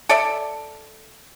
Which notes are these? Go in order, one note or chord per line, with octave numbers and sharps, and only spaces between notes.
A4 D5 E5